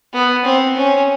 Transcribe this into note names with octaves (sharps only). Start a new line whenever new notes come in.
B3
C4
C#4